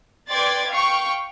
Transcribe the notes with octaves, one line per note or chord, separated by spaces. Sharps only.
B4 D5 G5 C6 G#6 A6
F5 G5 C#6